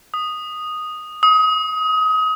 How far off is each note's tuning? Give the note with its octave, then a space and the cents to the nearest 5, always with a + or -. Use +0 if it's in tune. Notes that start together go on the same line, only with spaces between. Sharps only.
D#6 -5
D#6 +25